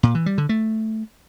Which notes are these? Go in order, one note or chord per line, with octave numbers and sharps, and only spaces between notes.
A#2
E3
G3
D3
A3